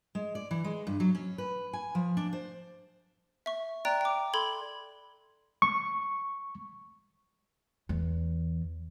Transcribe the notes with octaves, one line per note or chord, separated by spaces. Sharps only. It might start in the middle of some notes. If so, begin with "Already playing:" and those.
G#3
D5
E3
G#3
G2
F#3
C#4
B4
G#5
F3
D4
C5
E5 C#6
D5 G5 A#5 F#6 D7
G5 D6
A4 B5 C6 G#6
C#6
E2